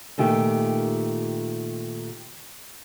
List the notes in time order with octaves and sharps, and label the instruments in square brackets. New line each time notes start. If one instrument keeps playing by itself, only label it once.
[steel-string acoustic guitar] A#2 D#3 A3 G4